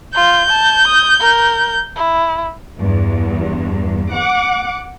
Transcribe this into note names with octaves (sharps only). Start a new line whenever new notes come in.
F4 G6
A5
D#6
A#4
E4
E2 G2
F#5 D6